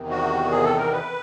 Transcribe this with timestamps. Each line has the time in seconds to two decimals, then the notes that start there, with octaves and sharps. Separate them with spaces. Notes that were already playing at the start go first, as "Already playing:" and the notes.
Already playing: E2 C3 D#3
0.10 F#4
0.51 G#4
0.64 A4
0.78 A#4
0.92 B4